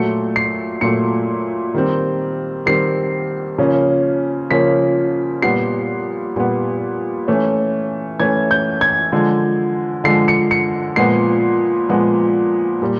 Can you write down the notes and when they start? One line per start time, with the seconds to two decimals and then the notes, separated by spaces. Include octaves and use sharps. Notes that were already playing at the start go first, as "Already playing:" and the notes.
Already playing: A#2 F#3 A3 C#7
0.36 C7
0.81 A#2 F#3 A3 C#7
1.74 D#3 G3 C4
2.66 D#3 G3 C4 C7
3.58 C#3 F3 A#3 C#4
4.51 C#3 F3 A#3 C#4 B6
5.42 A#2 G3 B3 C7
6.36 A#2 G3 B3
7.28 E3 A3 C#4
8.20 E3 A3 C#4 G#6
8.51 G6
8.81 G#6
9.12 D3 F3 G#3
10.04 D3 F3 G#3 C7
10.28 C#7
10.51 C#7
10.96 A#2 F3 G#3 B3 C7
11.89 A#2 F3 G#3 B3
12.82 A#2 G3